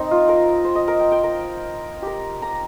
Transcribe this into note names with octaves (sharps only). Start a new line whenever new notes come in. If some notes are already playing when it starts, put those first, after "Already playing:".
Already playing: C4 D#4 A#4
F4
A#4
C5
D#5
A#4
G5
G5
A#4
G4 A#4
A#5